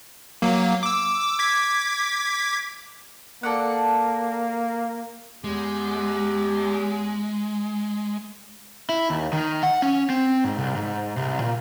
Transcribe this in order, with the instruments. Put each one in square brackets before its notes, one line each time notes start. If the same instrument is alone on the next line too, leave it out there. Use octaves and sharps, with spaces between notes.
[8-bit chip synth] F#3 A#3
D6 E6
D6 G#6 B6
[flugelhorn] A#3 [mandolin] A4 D5 F#5
[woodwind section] E2 G4 [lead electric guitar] G#3
[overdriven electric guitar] E4
D#2
D#3
F#5
C#4
C4
G#2
C2
G#2
C2
A#2